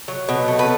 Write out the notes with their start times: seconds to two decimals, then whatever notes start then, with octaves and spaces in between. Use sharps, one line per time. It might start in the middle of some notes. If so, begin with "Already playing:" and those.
0.08 F#3
0.29 B2
0.48 A3
0.59 B4